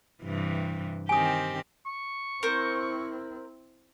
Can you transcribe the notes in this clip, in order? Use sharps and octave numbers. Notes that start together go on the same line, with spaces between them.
G2 C3 E3
D#3 C4 G4 G#5 D#6
C#6
C4 E4 A#4 C5